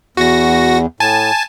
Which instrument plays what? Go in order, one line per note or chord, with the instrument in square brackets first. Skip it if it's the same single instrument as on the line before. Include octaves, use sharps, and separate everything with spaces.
[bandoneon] E2 [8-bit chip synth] F#4 A#6
[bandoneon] A2 [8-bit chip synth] G#5 A5